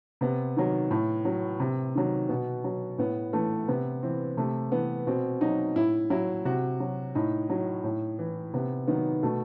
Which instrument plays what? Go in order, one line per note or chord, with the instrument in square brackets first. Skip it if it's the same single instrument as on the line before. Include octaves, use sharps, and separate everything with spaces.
[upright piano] C3 B3
D#3 F#3
A2
F#3
C3
D#3 F#3
B2 B3
F#3
A2 B3
E3 A3
C3 B3
E3 C4
C3 A3
E3 B3
B2 C4
F#3 D#4
A2 E4
F#3 E4
C3 F#4
F#3
A2 D#4
F#3
A2
E3
C3 B3
D#3 F#3 B3
B2 A3